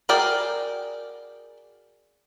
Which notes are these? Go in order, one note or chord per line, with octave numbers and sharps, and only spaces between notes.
F#4 G#4 A#4 D5 G5